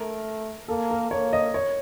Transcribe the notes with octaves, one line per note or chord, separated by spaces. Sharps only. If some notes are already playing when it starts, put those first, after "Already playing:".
Already playing: A3 A#4
A#3 A4
A#4
A#3 C#5
D#5
C#5